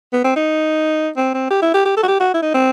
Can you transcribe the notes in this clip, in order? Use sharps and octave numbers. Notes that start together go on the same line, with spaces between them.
B3
C4
D#4
C4
C4
G4
E4
G4
G4
A4
F#4
G4
F#4
E4
D#4
C4